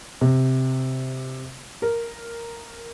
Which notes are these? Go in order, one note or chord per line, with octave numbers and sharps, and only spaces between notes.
C3
A#4